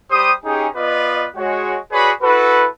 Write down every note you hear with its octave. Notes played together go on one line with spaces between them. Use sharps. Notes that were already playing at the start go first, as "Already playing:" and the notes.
G3 G4 C5 D#6
C#4 D#4 G4 G#4
B3 F4 B4 D5 D#5
G#3 F#4 C#5
F#4 G#4 B4 C#5 D5 B5
E4 F#4 A4 B4